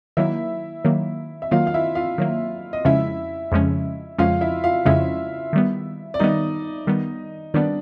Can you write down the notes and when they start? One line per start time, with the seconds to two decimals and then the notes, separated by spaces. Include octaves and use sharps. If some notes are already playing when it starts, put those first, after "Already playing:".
0.17 D#3 F#3 A#3 E4 E5
0.85 D#3 F#3 A#3
1.42 E5
1.51 D#3 F#3 A#3 F4 F5
1.67 F5
1.74 E4 E5
1.95 F4 F5
2.18 D#3 F#3 A#3
2.73 D#5
2.85 F2 C#3 F3 G#3 C#4 E4 E5
3.52 F2 C#3 F3 G#3 C#4
4.18 F2 C#3 F3 G#3 C#4 F4 F5
4.41 E4 E5
4.64 F4 F5
4.85 F2 C#3 F3 G#3 C#4 E4 E5
5.53 D#3 G3 B3
6.14 D5
6.19 D#3 G3 B3 D#4 D#5
6.87 D#3 G3 B3
7.54 D#3 G3 B3 D4 D5